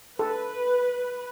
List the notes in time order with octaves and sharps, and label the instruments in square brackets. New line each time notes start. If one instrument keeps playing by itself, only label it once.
[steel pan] A4 [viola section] B4